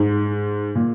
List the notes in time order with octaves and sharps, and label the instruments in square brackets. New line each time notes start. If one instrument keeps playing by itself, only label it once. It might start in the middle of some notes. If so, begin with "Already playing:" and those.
Already playing: [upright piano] G#2
A#2